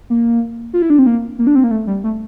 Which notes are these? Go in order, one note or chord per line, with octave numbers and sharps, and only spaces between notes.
A#3
F4
E4
D4
C4
A#3
A#3
D4
C4
A#3
A3
G3
A3